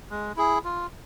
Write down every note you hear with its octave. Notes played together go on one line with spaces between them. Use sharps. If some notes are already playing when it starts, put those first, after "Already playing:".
G#3
E4 G#4
F4